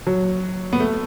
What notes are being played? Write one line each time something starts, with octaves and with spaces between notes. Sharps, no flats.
F#3
B3
A3